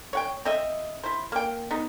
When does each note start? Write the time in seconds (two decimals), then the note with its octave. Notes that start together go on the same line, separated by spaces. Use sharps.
0.13 C#5 F#5 G5
0.45 C4 D#5 E5
1.04 E4 C5
1.32 A#3 G5
1.71 B3 D#4